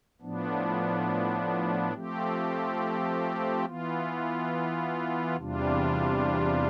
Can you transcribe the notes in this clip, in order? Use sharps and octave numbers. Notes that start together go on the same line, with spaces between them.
A2 F3 B3 D4
F3 A3 C4 G4
E3 B3 F4
E2 C3 G3 D4 F4